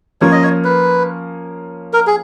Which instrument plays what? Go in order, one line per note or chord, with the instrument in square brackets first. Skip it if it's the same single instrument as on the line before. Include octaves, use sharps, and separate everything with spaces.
[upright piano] F3 A#3 C#4 [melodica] C#5
[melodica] D#5
C#5
B4
A#4
G#4